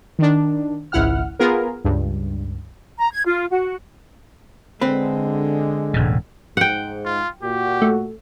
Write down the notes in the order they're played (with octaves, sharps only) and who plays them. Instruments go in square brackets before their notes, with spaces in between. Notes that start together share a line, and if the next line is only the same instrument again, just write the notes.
[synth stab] D#3 D4
G#1 C#2 E4 F#5 F6
B3 F4 G#4 A#4
C#2 G2
[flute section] A#5
G#6
F4
F#4
[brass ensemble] D3 G#3 [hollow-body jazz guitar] C4 B4
[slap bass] E1 A2 C#3
[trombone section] G#2 [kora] F#5 G5
[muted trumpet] F4
[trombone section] A#2 F#4 [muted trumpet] G4
[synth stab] A3